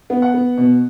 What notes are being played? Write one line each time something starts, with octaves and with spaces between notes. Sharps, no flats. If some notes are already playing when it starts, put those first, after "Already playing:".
B3
F#5
B3
B2